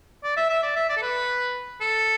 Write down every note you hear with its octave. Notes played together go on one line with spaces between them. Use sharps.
D5
E5
E5
D5
E5
D5
A4
B4
A4